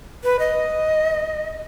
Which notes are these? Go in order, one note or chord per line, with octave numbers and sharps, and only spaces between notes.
B4
D#5